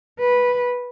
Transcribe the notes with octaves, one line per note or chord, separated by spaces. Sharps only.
B4